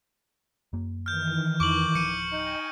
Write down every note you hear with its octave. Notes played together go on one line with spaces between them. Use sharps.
F#2 A#3
D#3 E3 F6 G6
F2 C#6 D6 F#7
D1 F3 C#7 D#7
D#4 D#5 G5 G#5